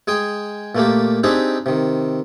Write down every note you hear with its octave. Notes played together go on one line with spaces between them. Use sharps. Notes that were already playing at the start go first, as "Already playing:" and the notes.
G#3 G#4 G5
A#2 A3 A#3 G4
C4 D4 D#4 G4 G#4 E5
C3 D#3